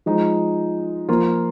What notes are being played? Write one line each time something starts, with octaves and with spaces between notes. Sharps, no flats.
F3 G#3 D#4
F3 A#3 F4